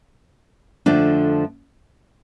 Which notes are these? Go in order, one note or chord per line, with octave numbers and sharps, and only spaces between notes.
F2 D3 F3 A3 D4